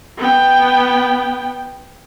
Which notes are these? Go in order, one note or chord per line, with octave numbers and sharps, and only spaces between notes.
B3 G5